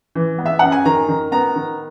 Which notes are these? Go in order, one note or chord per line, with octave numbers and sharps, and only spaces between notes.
E3
B3
E5
F#2 F#5
G#5
D#3 A#5
D#3
B3 A#5
D#3